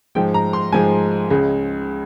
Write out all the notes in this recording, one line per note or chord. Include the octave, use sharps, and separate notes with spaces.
G#2 F3 G#3 G5
A#5
C6
G#2 F3 G#3 G#5
C#2 C#3 G#3